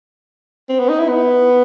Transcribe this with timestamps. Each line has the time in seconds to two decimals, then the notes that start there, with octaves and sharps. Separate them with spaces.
0.69 C4
0.79 B3
0.89 D#4
0.99 E4
1.09 B3